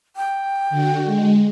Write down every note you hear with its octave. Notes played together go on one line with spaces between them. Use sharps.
G5
D3 F#4
G#3